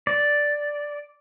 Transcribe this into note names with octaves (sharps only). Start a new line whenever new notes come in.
D5